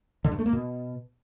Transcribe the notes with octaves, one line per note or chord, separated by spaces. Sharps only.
D3
G2
A3
A#3
B2